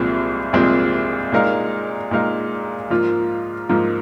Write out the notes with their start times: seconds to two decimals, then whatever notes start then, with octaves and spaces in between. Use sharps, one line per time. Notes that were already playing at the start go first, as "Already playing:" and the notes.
Already playing: C2 A#2 F3 G#3 C4
0.53 C2 A#2 F3 G#3 C4
1.32 A#2 G#3 D#4 A#4 F5
2.11 A#2 G#3 D#4 A#4 F5
2.90 G#2 F3 A#3 F4
3.69 G#2 F3 A#3 F4